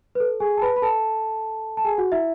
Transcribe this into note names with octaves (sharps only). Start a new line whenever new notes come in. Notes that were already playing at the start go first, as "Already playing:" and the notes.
B4
A4
G#4 G#5
A5
B4 B5
B5
A4 A5
A5
G#4 G#5
F#4 F#5
E4 E5